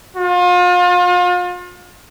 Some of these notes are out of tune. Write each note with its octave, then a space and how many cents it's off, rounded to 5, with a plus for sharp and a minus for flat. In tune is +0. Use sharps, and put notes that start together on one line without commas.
F4 +35